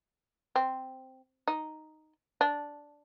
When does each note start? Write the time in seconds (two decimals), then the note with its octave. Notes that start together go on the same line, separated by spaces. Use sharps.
0.56 C4
1.48 D#4
2.41 D4